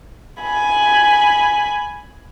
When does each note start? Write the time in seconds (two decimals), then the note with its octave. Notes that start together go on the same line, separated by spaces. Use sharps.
0.41 G#5 B5